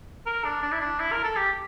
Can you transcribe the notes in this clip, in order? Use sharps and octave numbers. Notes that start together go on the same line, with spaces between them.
A#4
D4
D4
E4
D4
E4
A#4
A4
G4